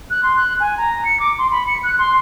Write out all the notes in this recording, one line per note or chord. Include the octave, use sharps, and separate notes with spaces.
F#6
C6
F#6
G#5
A#5
C#7
D6
C6
B5
C#7
F#6
C6